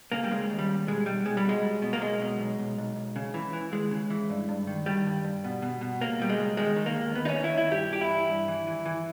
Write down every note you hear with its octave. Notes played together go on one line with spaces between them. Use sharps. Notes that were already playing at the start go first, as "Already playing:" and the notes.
C#3 A#3
G3
C#3 G#3
D#2
G3
D#2
B1 G#3
B1 G3
B1 G#3
G3
B2 G#3
B1
B2
A#3
B1 G#3
B2
B1
B1
B1
B1
C#3
E3
E3
D#2 G#3
C#3
E3
G2
G2
D#3
D#3 G3
G2
G2
B2
B2
B2
C#2 A#3
B2 G3
G#3
C#2
D#3 G#3
D#3
A#3
D#2
D#2 B3
D#4
C#4
D#2
E4
D#2
E4
G2 G4
G2 G4
E4
E3
G2
E3
E3
E3